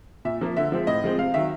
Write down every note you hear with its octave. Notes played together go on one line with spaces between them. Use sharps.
A#2 E5
F3 A#3
D3 E5
F3 G#3 C4
A2 D#5
F3 G#3 C4
C3 F5
D#3 F#3 E5